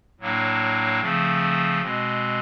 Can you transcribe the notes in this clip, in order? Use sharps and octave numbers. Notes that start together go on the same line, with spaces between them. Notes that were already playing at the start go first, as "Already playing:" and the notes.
A2 F#3 A#3 D4
C#3 F3 A3 C4
B2 G#3 C4